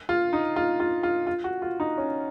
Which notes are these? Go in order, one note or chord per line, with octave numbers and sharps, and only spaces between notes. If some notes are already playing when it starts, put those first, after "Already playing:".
F4
D#4
F4
F4
F4
F4
F#4
F4
D#4
C#4